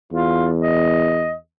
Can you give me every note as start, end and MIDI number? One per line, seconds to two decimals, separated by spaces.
0.13 1.37 40
0.13 0.48 65
0.61 1.33 75